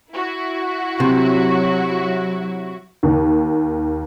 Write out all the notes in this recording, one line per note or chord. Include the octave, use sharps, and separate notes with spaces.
E4 F#4
C3 F#3
D#2